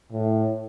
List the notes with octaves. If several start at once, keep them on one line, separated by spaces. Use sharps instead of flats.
A2